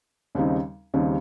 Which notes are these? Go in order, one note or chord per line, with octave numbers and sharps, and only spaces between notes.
D#2 C#3 G3 C4 D#4
D#2 C#3 G3 C4 D#4